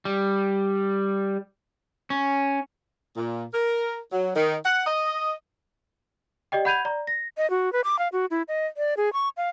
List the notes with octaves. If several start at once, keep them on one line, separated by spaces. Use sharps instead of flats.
G3
C#4
A#2
A#4
F#3
D#3
F#5
D#5
G4 D5 D#5 G5
F#5 B5 G6 G#6 D#7 F7
D5 A#5
A#6
D#5
F#4
B4
D6
F5
F#4
E4
D#5
D5
G#4
C#6
F5